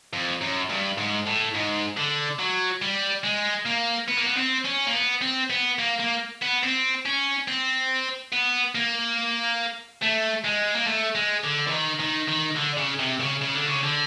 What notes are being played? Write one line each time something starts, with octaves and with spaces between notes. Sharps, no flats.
F2
F#2
G2
G#2
A2
G#2
D3
F#3
G3
G#3
A#3
B3
A#3
B3
C4
C#4
A#3
B3
C4
B3
A#3
A#3
B3
C4
C#4
C4
B3
A#3
A3
G#3
A#3
A3
G#3
D3
E3
D#3
D#3
D#3
D3
C#3
C3
C#3
C#3
D3
C#3
D3